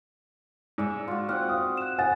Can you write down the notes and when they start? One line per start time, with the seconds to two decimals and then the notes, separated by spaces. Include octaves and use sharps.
0.78 G#2 D5 E5
1.08 F4 F#4
1.29 C4 F#5 D6 F6 F#6
1.49 F5 D#6
1.77 F#6 E7
1.99 D#5 F#5 G#5 A6